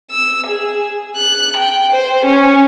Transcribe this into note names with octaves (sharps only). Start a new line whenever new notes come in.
E6
G#4
F#6
G5
C5
C#4